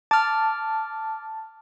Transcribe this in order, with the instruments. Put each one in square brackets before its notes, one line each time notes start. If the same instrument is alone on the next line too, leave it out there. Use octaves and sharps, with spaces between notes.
[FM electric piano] A5 [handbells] D6 F6